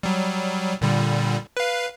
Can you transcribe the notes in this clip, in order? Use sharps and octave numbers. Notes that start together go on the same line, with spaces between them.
F#3 G3
A#2 D3 G3
B4 F5